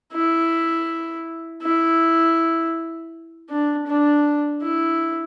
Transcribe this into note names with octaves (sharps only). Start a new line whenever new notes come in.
E4
E4
D4
D4
E4